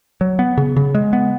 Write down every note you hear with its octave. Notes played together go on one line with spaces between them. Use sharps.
F#3
B3
C#3
C#3
G#3
B3